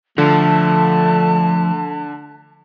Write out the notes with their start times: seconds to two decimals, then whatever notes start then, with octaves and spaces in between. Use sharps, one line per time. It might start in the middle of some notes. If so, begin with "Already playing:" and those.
0.18 D3 F3 A3 A5